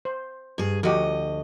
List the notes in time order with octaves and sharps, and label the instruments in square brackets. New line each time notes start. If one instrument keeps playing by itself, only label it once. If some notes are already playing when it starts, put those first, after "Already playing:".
[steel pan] C5
[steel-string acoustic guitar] G2 G#4
[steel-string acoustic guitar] D2 D#5 [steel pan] F3 F#4 G4